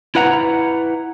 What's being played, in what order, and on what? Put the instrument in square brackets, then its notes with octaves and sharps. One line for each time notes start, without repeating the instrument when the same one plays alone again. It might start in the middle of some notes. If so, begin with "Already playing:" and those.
[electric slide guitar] E4 B4 F#5 A#5